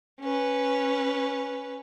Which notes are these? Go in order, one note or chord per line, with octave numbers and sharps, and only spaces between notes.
C#4 B4